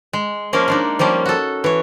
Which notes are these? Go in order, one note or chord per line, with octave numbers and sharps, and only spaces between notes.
G#3
F3 G#3 A#3 C#4 A#4
G#3 D4 D#4
F3 G3 A#3 C#4
F#4 A4
E3 C#5